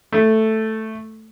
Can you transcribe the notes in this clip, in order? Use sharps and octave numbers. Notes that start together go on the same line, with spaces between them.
A3